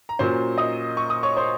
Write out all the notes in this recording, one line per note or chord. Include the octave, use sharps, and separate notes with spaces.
A#5
A#2 F#3 A#3 C#4 C5 C6
D#5 D#6
C#6
D#6
C#5 C#6
C5 C6